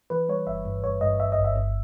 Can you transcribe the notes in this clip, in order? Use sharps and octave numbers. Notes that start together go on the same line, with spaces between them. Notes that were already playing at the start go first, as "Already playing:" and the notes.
E3 B4
G3 C#5
G1 E5
G2
G2 C#5
G2 D#5
G1 E5
D#5
G1
E5
G1